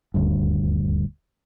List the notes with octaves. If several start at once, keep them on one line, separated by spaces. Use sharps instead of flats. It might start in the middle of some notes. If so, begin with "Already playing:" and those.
D#1 D2 G2